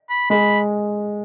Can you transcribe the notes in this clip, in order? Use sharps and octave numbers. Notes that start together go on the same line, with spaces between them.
B5
G#3 B5